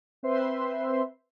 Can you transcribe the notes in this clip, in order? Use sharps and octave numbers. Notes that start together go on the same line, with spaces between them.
C4 B4 C5 E5 C6